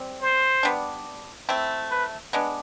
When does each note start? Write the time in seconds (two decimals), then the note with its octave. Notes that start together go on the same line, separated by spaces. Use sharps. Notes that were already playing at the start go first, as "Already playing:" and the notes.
Already playing: G3 C4
0.21 C5
0.63 G3 B3 D4
1.49 A3 C4 E4
1.91 B4
2.33 G#3 B3 D4